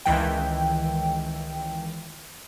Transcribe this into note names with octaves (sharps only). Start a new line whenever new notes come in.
C#2 D#3 E3 G5